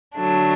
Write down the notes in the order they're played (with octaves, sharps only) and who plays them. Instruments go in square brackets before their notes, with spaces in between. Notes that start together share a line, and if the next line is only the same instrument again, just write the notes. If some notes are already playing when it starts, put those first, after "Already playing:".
[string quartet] D3 F#3 A3 D4